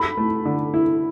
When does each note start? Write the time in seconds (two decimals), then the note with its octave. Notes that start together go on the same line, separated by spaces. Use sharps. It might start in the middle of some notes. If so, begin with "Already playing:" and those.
Already playing: A4 B5
0.18 A3
0.45 D3
0.74 E4